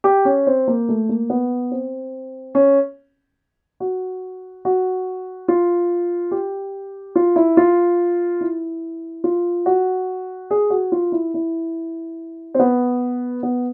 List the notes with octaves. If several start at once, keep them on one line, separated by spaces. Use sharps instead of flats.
G4
C#4
C4
A#3
A3
A#3
B3
C4
C#4
F#4
F#4
F4
G4
F4
E4
F4
E4
F4
F#4
G#4
F#4
F4
E4
E4
C4
B3
B3